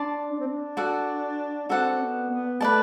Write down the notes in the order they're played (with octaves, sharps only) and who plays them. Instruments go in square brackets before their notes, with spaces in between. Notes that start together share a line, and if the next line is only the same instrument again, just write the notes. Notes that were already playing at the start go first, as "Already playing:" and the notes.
Already playing: [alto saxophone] D4 [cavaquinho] D5 A5 C6
[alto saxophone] D4
C4
D4
[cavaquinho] F#4 A4 D5 F#5
[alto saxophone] C4 [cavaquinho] F#4 A4 D5 F#5
[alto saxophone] B3
B3
[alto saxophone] A3 [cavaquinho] B4 D5 A5